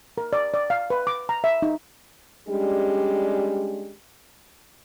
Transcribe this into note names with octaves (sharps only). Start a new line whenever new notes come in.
A#4
D5
D5
F5
B4
D6
A#5
E5
D#4
G3 G#3 C#4 D4 G4